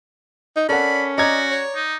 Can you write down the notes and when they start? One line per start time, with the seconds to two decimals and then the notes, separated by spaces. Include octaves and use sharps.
0.56 D#4
0.69 C#4 A4 A#4 D5 F#5 B5
1.18 F#4 D5 D#5 A#5 G#6
1.51 C#5
1.75 D#4